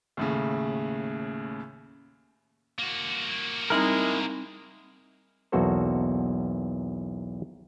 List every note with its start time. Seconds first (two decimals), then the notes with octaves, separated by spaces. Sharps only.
0.17 D#2 A2 C#3
2.79 A#3 F#4
3.70 G3 G#3 C4 D#4 E4 A#4
5.52 B1 E2 A#3 F#4 A4 C5